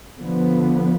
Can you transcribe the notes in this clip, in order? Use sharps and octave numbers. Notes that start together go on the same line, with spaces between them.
D3 F3 B3